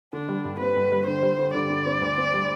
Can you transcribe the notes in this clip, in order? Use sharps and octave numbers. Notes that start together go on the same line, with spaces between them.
D3 D4
G3
G2
C4 B4
G2
G3
D3 C5
G3
D3
D3 D5
D3
C4
D2
C4
G3